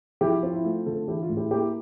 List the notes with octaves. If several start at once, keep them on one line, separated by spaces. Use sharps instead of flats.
F3 E4 G4
C4 F4
E4
A3 F4
D3 F4 A4
E3 E4 G4
F4
A2
E4 G4
A#3 E4 G4